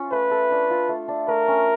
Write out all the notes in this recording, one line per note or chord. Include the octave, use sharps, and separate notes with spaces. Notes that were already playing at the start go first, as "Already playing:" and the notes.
Already playing: C#4 F4
A3 B4
A4
D4
F4
A3
D4
A3 A#4
C#4